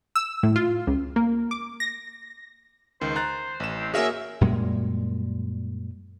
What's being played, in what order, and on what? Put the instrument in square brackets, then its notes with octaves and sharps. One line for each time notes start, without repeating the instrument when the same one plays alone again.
[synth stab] E6
A2
F4
C#2
A#3
D6
A#6
[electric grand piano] C#2 D#3 [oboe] C5
[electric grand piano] A#5 F#6 A6
A1 E7
[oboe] C4
[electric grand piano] A#3 F#4 G#4 [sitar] C#4 E5 [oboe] A#4
[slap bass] F#2 A#2 G3 G#3